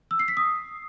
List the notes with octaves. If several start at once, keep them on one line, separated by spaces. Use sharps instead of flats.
E6
C7
B6
D#6